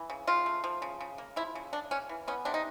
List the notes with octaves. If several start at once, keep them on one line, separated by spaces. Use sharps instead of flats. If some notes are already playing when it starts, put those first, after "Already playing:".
Already playing: E3
C#3
C#3 F4
A3
F3
C#3
C#3
A#3
F3 E4
C#3
C#3 D4
A#3 C#4
E3
B3 C#4
C3 D4
D#4